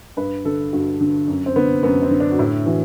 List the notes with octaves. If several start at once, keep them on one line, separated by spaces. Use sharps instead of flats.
G2 B4
D3 A4
G2 F#4
D3
F#2
C4
D3 B3
F#2 B3
C4
D3
D4
F#4
A2 E4
E3 F#4